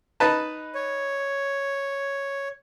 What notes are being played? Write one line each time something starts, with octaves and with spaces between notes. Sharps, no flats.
D#4 B4 A5
C#5